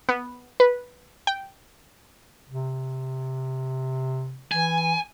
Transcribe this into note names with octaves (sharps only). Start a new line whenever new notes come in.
B3
B4
G5
C3
E3 G#5